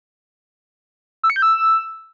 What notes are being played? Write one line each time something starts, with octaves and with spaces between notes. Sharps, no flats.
E6
C#7
G6
E6